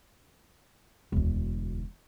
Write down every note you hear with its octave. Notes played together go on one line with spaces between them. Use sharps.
E1 D2